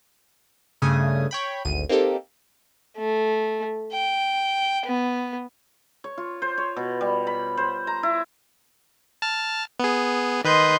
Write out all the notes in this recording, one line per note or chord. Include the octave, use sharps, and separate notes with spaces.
G2 C#3 A3 G#5 D#6
C#5 G5 B5
G#1 D2 D#7
A#3 C4 D#4 G4 A4
A3
G5
B3
C#5
F4
C5
C#5
B2
G3
B5
C5
A#5
E4
A5 F6
B3 G#4
D#3 B4 D#5 C6 G6